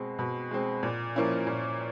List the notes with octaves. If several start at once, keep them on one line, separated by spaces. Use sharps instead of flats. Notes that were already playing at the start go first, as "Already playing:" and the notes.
Already playing: B2 G#3 C4
B2
G#3 C4
A#2
F3 A#3 C#4 E4
A#2